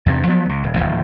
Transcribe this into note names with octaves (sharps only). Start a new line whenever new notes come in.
E2 G2 C3
F3 F#3 B3
C#2
D#1
D1 G#1 D#2 F3